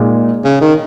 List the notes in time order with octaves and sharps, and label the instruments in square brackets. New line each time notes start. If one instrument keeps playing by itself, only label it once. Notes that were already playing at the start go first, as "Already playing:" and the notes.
Already playing: [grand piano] A#2 G#3 D#4
[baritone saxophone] C#3
D#3